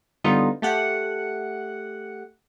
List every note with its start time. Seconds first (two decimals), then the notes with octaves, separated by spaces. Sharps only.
0.24 D3 G3 B3 D#4 F4
0.62 A3 G4 F#5